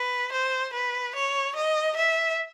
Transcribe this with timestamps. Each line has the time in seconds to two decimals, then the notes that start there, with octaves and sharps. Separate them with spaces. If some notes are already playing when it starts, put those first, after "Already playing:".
Already playing: B4
0.32 C5
0.73 B4
1.15 C#5
1.55 D#5
1.96 E5